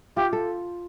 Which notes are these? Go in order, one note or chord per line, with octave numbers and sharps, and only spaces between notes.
F4 G4
A4